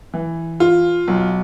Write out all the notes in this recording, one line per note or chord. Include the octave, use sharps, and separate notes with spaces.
E3
F4
B1